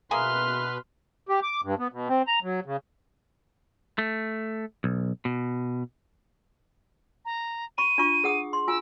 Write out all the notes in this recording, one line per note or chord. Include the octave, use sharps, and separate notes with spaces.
B2 A#3 G#4 B4 E5 C6 F6
G4
D6
G2
B3
B2
C4
A#5
F#3
C#3
A3
B1
B2
A#5
B5 C#6 D#7
D4 F4 C#6
G#4 F#5 D#6
C6
F4 G#5 D6 E6